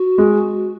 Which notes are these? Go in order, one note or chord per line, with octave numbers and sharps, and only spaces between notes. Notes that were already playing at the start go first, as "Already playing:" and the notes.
Already playing: F#4
G#3